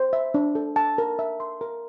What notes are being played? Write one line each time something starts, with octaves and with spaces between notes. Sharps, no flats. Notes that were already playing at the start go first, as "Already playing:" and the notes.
Already playing: C5
E5
D4
A4
A5
A#4
E5
C6
A#4